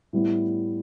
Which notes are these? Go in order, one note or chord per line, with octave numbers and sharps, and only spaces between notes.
A2 G3 B3 E4